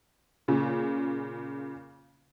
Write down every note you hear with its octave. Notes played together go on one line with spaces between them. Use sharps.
A#2 C#3